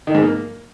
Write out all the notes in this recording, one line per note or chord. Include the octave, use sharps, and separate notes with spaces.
D#3
G#2
A#3